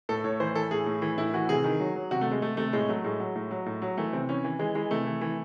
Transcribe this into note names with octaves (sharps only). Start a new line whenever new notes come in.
A2 A4
A2 C#5
E3 C5
E3 A4
A2 G#4
A2
E3
A2 E4
E3 F#4
C3 G#4
D#3
F#3
F#3
C3 F#4
A3
C3 G#3
C3 A3
C3 A3
A2 G#3
F#3 A3
A2 G#3
F#3
A2
F#3
A2
F#3
E3 A3
C3 C4
E3 C#4
E3
E3 G#3
E3 G#3
C3 A3
E3
E3